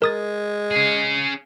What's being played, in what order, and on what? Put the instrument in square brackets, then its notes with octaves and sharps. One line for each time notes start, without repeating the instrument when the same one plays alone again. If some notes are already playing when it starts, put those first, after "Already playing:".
[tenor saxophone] G#3 [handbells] A#4 D#6 A6
[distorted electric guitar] C#4 G#4